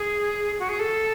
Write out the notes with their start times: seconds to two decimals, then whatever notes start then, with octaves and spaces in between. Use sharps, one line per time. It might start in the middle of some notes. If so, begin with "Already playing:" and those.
Already playing: G#4
0.59 F#4
0.69 G#4
0.79 A4